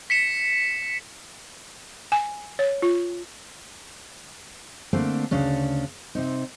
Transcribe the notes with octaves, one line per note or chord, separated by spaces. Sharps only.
B6 C#7 E7
G#5
C#5
F4
D3 A3 A#3 C4 D4
D2 C#3 C#4 D4
C3 C4 D#4